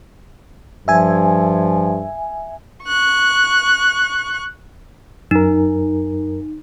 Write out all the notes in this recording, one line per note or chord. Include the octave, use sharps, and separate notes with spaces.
G2 F3 E5 G#5
C#6 F#6
F#2 D#4 A#4